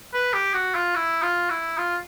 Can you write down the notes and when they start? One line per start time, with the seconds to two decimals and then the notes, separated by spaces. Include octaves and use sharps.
0.14 B4
0.33 G4
0.54 F#4
0.75 F4
0.95 E4
1.22 F4
1.50 E4
1.78 F4